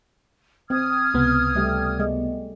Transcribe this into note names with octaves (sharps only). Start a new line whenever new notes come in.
C4 D#6 F6 G#6
C#2 C3 B3
G3 A3 G4
G#3